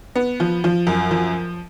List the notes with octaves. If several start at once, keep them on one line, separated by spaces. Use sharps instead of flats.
B3
F3
F3
F#2
F3